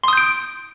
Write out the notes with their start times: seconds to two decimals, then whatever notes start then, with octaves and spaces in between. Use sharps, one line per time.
0.04 C6
0.08 D#6
0.13 G6
0.18 D7